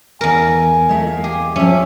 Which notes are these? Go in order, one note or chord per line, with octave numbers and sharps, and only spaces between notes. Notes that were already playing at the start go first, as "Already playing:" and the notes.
E2 A#4 G#5
G#3 A3 E5
F5
G4 G#4
F3 G3 C#4 E5